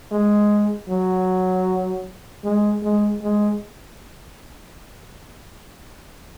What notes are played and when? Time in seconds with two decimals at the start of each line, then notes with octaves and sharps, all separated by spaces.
0.11 G#3
0.89 F#3
2.44 G#3
2.82 G#3
3.22 G#3